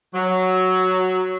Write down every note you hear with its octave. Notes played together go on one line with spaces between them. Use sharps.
F#3